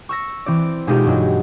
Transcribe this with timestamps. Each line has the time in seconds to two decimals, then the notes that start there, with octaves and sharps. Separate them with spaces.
0.09 C#6 E6 A#6
0.46 E3 C4 D5
0.87 B2 G#3 D#4 F4 G4 A4
1.06 G2 F#3 G#3